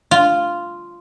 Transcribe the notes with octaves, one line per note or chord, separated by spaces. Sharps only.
F4